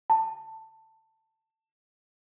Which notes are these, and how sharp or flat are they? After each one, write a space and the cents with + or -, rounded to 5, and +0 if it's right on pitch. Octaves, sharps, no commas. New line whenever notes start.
A5 +15